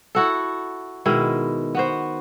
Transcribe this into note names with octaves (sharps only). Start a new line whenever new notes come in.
E4 F#4 A4
B2 D#3 G#3 E4
B3 F#4 C5